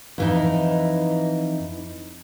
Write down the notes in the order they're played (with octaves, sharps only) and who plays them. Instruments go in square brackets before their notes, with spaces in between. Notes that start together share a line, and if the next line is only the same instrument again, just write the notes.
[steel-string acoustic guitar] F2 E3 D#4